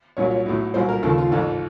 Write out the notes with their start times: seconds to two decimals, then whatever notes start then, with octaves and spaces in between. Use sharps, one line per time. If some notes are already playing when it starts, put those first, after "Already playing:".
0.17 C2 A#2 F#3 C#5
0.31 C#5
0.46 B1 A2 F#3
0.74 C2 A#2 F#3 C5
0.89 A#4
1.03 D#2 C#3 F3 A4
1.18 F4
1.31 A1 G#2 F3 A4